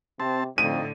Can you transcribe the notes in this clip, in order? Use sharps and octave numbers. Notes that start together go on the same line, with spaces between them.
C3 C4 A5
F2 A2 D3 D#4 D#7